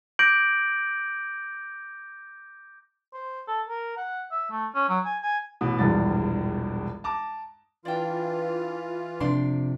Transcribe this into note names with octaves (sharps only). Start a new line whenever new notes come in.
D6 G6 A#6 D7 F#7
C5
A4
A#4
F#5
E5
A3
C#4
F#3
G#5
G#5
A1 B2 D#6
E1 A#1 E2 G2 A6
A5 A#5 D6
E3 D4 F4 G5
F2 C3 D4 C6